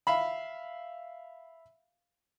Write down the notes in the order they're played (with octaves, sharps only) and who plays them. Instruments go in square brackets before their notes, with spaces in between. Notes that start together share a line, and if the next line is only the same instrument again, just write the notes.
[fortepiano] E5 F5 B5